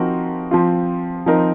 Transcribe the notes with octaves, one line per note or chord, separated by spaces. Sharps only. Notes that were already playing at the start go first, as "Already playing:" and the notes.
Already playing: F3 C4 D#4 F#4 A#4
F3 C4 F4
F3 C4 D#4 A#4